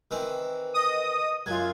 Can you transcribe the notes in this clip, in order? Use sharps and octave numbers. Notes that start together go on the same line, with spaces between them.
D#3 E3 C4
D#5 D#6
F#2 F#3 F4 G#6